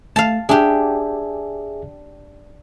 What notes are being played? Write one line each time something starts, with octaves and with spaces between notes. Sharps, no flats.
A3 F5 A5
D4 G4 G#4 E5 G#5